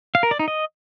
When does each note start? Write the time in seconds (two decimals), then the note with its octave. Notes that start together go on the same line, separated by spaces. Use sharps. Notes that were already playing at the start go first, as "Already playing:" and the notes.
0.15 F5
0.23 A#4
0.31 D5
0.39 D#4
0.48 D#5